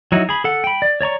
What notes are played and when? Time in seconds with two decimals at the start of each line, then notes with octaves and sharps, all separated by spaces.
0.12 F#3 D#4 E4 F#4
0.29 G#4 B5
0.44 A4 F#5
0.64 G5 B5
0.82 D5
1.01 C#5 D5 A#5 C#6